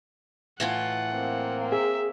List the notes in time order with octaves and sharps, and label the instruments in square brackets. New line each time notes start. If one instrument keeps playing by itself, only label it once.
[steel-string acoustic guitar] A2 E3 F4 [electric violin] F#5
[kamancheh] A#3 C4
[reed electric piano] G#4 [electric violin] E5